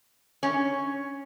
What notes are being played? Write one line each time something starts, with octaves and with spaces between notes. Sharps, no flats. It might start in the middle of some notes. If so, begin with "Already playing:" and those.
C#4